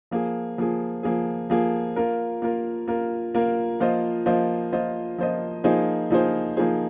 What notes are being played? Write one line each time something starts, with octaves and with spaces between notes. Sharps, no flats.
F3 A#3 G#4
F3 A#3 G#4
F3 A#3 G#4
F3 A#3 G#4
A#3 F4 A#4
A#3 F4 A#4
A#3 F4 A#4
A#3 F4 A#4
F3 A#3 F4 C5 D#5
F3 A#3 F4 C5 D#5
F3 A#3 F4 C5 D#5
F3 A#3 F4 C5 D#5
F3 A#3 D#4 G#4 C5
F3 A#3 D#4 G#4 C5
F3 A#3 D#4 G#4 C5